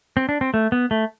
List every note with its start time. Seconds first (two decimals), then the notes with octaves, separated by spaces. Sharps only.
0.17 C4
0.29 D4
0.41 C4
0.54 A3
0.72 B3
0.91 A3